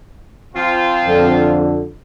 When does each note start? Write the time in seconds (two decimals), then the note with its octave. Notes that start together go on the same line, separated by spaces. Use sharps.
0.56 F3 C4 F4
1.05 F2 D3